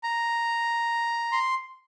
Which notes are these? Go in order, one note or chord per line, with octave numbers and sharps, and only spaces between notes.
A#5
C6